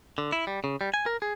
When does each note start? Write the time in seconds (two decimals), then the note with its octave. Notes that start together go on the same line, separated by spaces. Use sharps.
0.18 D3
0.32 E4
0.47 G3
0.64 C#3
0.81 G3
0.94 G#5
1.06 A#4
1.22 G#4